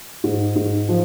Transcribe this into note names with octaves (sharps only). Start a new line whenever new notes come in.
G#2
G#2
F3